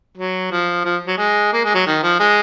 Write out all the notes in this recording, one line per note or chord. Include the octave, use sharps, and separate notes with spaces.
F#3
F3
F3
F#3
G#3
A#3
G#3
F#3
D#3
F3
G#3